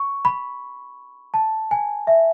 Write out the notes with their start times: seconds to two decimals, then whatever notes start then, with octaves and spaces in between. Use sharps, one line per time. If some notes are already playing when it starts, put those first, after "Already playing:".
Already playing: C#6
0.25 B5
1.34 A5
1.71 G#5
2.07 E5